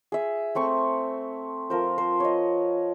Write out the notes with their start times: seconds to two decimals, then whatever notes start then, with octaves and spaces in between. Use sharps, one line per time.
0.12 G#4 E5
0.55 A3 C4 C#6
1.70 F3 A#4 C5
1.98 C5
2.20 C#5 D#5